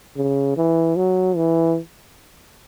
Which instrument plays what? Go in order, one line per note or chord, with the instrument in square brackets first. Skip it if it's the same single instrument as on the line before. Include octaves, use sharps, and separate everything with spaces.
[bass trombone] C#3
E3
F#3
E3